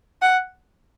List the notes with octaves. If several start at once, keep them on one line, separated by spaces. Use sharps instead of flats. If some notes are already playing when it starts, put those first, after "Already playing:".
F#5